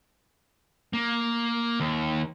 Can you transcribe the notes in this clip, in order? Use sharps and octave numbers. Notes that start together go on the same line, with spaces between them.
A#3
D#2